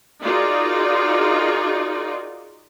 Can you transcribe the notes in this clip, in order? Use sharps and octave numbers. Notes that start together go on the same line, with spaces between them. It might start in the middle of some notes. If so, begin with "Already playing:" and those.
D#4 F4 F#4 G#4 A#4 D5